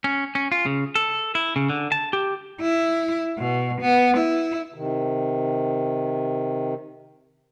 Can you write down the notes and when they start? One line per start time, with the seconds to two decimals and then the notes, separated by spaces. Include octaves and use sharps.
0.04 C#4
0.35 C#4
0.52 F4
0.66 C#3
0.95 A4
1.35 E4
1.56 C#3
1.69 D3
1.92 A5
2.13 G4
2.61 E4
3.38 B2
3.81 B3
4.17 E4
4.74 C3 D#3